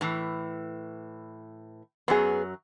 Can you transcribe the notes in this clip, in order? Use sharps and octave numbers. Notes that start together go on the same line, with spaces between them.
A2 E3
F#2 F#3 B3 G#4